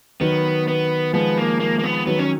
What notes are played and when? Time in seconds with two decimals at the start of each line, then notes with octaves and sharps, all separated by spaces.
0.21 D#3 F#3 B3
0.68 B3
1.14 F3 G#3 B3
1.38 A#3
1.60 A#3
1.79 A#3
1.84 B3
2.07 D#3 F#3 B3
2.19 C#4